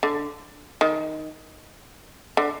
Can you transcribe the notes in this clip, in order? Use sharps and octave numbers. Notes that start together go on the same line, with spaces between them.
D3
D#3
D3